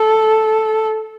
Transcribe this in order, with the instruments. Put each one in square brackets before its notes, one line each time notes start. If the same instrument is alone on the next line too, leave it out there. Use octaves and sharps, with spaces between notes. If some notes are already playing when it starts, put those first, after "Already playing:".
Already playing: [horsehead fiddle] A4